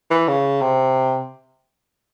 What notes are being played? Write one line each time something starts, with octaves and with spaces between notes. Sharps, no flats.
E3
C#3
C3